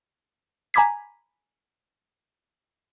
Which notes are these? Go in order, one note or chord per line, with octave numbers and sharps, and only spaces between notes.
G#5 A#5 B5 D6 G#6 B6